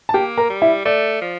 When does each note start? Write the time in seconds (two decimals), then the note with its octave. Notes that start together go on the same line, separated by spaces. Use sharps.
0.09 A5
0.14 A#3 G4 G5
0.38 A#4 A#5
0.50 G3
0.62 E4 E5
0.85 A3 D5
1.21 F3